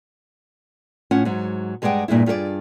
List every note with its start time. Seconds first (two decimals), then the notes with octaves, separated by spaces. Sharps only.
1.11 A2 C#4 F4 F#5
1.25 G#2 F#3
1.82 G2 G#3 G#4 D5 F#5 G5
2.08 G2 A#2 G#3 E4
2.26 G2 F4 G#4 A4 D5